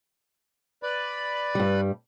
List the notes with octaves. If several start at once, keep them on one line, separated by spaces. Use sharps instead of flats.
B4 D5 B5
G2 G3